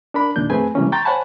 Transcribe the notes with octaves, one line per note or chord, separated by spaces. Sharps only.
D4 A#4 B5
D#2 A#2 D4 G6
F2 A3 C4 G#4 B4 G#5
C3 E3 G3 G#3 A#3 C#4
G5 A#5 C6 C#6 G6 A6
C5 C#5 F#5 G#5 A5 B5